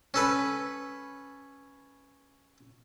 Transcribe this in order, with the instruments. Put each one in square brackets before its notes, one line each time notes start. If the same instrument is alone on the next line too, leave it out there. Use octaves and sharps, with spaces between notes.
[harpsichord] C#4 A4 B4